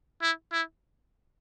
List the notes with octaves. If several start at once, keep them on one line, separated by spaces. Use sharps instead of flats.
E4
E4